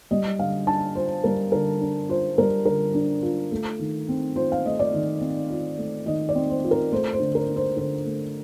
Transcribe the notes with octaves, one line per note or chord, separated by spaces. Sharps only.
G3 D#5
D3 F5
D4 A5
F4 C5
G3 A#4
D3 A#4
D4
F4 C5
G3 A#4
D3 A#4
D4
F4
A3
D#3
C4
F4 C5
F5
A3 D#5
D5
D#3
C4
F4
A3
D#3 D#5
D5
C4
C5
F4
A#4
A3 C5
C5
D3
A#4
D4
C5
D3 C5
A3